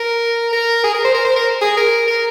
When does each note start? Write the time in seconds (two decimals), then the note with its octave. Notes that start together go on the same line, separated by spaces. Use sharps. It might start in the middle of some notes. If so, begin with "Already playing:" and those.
Already playing: A#4
0.53 A#4
0.84 G#4
0.94 A#4
1.05 C5
1.14 A#4
1.25 C5
1.36 A#4
1.62 G#4
1.77 A#4
2.08 A#4